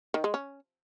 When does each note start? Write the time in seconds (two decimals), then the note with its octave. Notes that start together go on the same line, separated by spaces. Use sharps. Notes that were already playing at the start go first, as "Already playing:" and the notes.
0.14 D#3
0.24 G#3
0.34 C#4